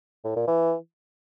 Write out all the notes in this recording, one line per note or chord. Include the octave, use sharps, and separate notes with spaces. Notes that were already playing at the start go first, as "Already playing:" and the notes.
A2
A#2
E3